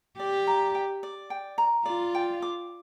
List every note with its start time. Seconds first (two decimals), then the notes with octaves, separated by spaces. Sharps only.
0.19 G4 D5
0.47 A#5
0.75 G5
1.03 D5
1.30 G5
1.58 A#5
1.86 F4 D5
2.15 G5
2.42 D6